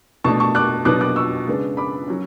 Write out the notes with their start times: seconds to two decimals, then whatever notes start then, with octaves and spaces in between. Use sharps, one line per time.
0.24 B2 A3 D4 A5 C#6
0.40 A5 C#6
0.55 D6 F#6
0.85 B2 F#3 B3 D4 D6 F#6
1.01 D6 F#6
1.16 C#6 E6
1.47 C#3 G#3 B3 D4
1.77 B5 D6
2.08 F#3 C#4